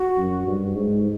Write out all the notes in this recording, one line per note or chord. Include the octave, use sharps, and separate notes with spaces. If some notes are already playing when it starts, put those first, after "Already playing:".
Already playing: F#4
F#2
G2
G#2